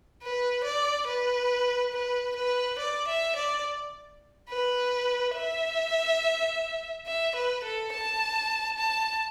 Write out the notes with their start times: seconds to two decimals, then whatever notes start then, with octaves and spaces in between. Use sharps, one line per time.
0.22 B4
0.64 D5
1.07 B4
1.93 B4
2.36 B4
2.79 D5
3.08 E5
3.36 D5
4.49 B4
5.36 E5
7.06 E5
7.35 B4
7.64 A4
7.93 A5
8.78 A5